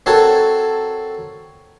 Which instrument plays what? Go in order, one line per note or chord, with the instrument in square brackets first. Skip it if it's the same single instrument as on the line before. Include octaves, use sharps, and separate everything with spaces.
[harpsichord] C4 F#4 A4 A#4 C#5 A5